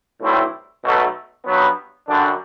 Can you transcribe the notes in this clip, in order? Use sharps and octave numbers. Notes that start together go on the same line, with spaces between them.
B1 A2 G3 C4 E4
B1 B2 F#3 A3
G2 F#3 B3
F#2 D3 G3 D4